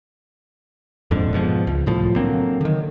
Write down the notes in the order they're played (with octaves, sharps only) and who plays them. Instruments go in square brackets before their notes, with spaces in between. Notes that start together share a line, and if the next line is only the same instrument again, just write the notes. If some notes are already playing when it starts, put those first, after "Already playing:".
[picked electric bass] D#1 F2 G#2 D3
G#2 B2 D#3 F3
C#2
C2 A2 F3
D3 F#3 A#3 C4
D3 D#3